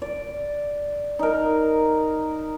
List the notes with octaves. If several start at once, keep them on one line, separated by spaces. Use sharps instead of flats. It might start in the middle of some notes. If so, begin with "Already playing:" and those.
D5
D#4 A#4